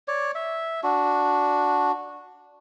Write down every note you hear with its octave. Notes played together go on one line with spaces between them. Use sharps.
C#5 D5
E5
D4 F#4